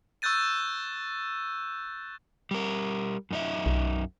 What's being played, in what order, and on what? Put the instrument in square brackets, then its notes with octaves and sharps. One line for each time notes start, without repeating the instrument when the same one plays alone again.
[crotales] C#6 E6 F#6 G6 A6 D#7
[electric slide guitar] G3 A#4
F#2 D#4 E5
[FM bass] B1